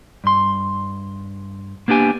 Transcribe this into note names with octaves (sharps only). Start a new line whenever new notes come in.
G2 C6
A#3 B3 D4 G4 G#5